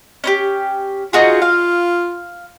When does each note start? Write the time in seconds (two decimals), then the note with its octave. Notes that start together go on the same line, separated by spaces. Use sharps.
0.24 C#4 D#4 G4
1.13 D#4 F4 F#4 G#4
1.42 F5